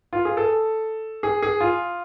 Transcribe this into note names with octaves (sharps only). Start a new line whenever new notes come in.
F4
G#4
A4
G#4
G#4
F4